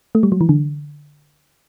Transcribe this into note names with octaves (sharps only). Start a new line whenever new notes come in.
A3
G3
F#3
E3
D3